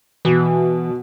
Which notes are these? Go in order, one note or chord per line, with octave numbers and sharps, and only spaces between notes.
B2 E3